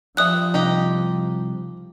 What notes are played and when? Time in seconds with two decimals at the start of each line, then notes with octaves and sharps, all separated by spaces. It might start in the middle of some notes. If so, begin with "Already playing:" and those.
0.17 F3 G3 E5 D#6 F#6
0.54 C2 D#4 G4 D#5